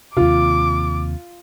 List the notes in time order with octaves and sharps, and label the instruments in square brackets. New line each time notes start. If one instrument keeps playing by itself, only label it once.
[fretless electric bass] D#2 C3 [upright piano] F4 [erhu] D6